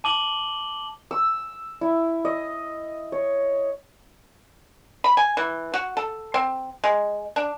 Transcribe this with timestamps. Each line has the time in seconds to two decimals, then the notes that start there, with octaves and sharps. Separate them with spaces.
0.04 A5 D6 F#7 G7
1.11 E6
1.81 E4
2.25 D#5
3.12 C#5
5.04 B5
5.17 G#5
5.37 E3
5.74 F#4
5.97 A4
6.34 C4
6.84 G#3
7.36 D4